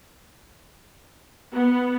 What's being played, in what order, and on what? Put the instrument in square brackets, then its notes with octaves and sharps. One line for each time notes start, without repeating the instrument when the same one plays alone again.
[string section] B3